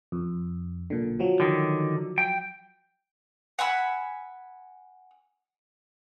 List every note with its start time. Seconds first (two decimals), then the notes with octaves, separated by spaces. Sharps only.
0.12 F2
0.90 B1 A#2 D3
1.20 F3 F#3
1.40 D3 D#3
2.18 G5
3.59 F#5 G#5 B5 E6